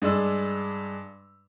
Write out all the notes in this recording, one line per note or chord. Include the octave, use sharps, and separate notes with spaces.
G2 G#3 D4 E6